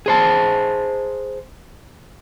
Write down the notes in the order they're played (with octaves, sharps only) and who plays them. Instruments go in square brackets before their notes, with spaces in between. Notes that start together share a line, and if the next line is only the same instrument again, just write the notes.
[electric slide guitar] G#4 C5 A5